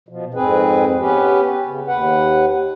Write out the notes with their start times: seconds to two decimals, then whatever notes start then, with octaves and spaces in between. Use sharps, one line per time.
0.09 B2 F3
0.34 F2 G#2 C4 G#4 B4
1.00 B3 C#4 G4 B4
1.66 C#3
1.88 D#2 B4 F#5